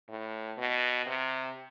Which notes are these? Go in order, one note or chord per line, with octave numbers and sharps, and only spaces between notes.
A2
B2
C3